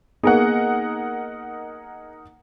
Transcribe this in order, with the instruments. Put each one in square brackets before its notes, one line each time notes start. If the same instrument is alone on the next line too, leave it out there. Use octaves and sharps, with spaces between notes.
[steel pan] A#3 B3 [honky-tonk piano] D#4 A#4 F#5 [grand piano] G#4